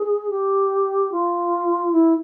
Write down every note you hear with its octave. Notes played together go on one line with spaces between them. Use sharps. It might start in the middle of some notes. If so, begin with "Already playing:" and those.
Already playing: G#4
G4
F4
E4